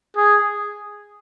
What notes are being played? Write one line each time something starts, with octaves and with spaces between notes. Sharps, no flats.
G#4